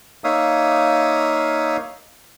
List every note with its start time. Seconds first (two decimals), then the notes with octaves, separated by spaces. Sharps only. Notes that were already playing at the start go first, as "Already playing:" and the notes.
0.24 A#3 D#4 C#5 E5 F5 D#6